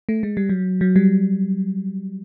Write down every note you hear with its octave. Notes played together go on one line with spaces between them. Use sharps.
A3
G#3
G3
F#3
F#3
G3